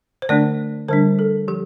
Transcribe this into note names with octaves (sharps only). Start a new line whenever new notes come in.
C5
D3 A3 D4 D5
D3 G3 D4 C5
A4
F3 G4